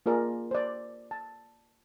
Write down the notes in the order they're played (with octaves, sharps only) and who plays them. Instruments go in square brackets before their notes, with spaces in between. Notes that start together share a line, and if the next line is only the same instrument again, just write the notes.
[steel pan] A#3 F4 G#4 A#4 D5
C5 D5
A5